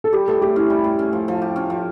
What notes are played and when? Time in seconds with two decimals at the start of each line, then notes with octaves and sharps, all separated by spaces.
0.04 A4
0.13 G3 G4
0.28 A2 A4
0.42 A2 G4
0.56 C#4 E4
0.70 G3
0.84 A2
0.99 C#4
1.13 F3
1.28 F3
1.42 G4
1.56 C#4
1.70 F3